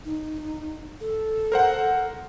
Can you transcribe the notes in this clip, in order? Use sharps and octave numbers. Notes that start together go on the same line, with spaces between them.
D#4
A4
A#4 C5 F#5